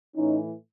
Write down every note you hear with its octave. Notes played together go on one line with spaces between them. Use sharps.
A2 E3 C#4 D#4